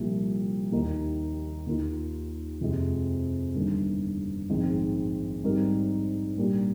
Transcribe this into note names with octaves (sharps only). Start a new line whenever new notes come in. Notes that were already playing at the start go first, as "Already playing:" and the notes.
Already playing: C2 A#2 F3
D#2 D#3 A#3 D#4
D#2 D#3 A#3 F4
F2 C3 F3 G#3
G1 G2 D#3 A#3
A#1 G#2 D#3 G#3 C4
G#2 G3 C4 G4 A#4
A#2 G3 A#3 D4 G4